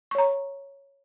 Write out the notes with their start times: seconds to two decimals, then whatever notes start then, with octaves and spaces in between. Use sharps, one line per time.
0.11 C#6
0.15 C#5
0.18 A#5